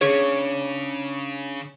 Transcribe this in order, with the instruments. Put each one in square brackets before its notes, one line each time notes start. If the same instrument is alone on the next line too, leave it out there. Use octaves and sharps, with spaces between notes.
[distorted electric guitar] C#3 [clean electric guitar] C#4 D4 [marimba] G#4 [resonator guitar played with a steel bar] C#5